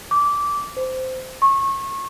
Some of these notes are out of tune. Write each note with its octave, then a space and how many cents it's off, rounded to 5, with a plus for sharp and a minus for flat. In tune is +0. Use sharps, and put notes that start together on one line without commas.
D6 -15
C5 -15
C#6 -25